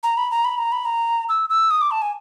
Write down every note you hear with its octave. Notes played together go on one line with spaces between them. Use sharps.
A#5
B5
A#5
B5
A#5
B5
A#5
E6
E6
D#6
D6
A5
G#5